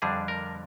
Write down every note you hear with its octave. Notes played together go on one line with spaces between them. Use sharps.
F2 D3 G3 D4 G#4
A#4